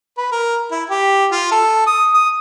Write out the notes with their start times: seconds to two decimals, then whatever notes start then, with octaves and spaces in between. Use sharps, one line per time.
0.18 B4
0.31 A#4
0.71 E4
0.90 G4
1.31 F4
1.52 A4
1.87 D#6
2.14 D#6